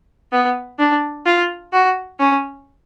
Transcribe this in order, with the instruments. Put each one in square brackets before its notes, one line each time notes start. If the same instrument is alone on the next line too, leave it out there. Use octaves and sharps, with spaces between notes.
[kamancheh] B3
D4
F4
F#4
C#4